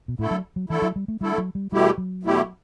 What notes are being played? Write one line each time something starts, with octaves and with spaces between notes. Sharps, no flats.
B2
A2 D3 A3 E4 A4
F#3
F#3
D3 E3 A3 E4 A4
F#3
G3
A3
D3 G3 A3 E4 A4
F#3
G3
E2 B2 G3 A3 E4 G4
F#3
E2 B2 A3 E4 G4